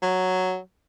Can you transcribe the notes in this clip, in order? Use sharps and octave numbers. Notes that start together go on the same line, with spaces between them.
F#3